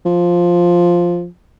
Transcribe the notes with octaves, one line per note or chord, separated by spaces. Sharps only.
F3